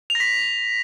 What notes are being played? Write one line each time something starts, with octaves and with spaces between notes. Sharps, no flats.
F7
A#6
B6